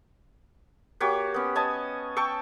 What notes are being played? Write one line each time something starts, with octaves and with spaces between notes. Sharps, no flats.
A#3 F#4 G4 C#5
B3 C#4
C#5 D#5 G#5 A5
G5 A5 C#6 E6